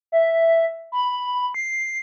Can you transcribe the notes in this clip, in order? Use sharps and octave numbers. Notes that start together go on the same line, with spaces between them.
E5
B5
C7